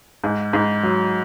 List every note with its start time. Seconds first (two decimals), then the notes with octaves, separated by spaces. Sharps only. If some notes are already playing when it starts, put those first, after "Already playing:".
0.24 G#2
0.53 G#2
0.83 F#3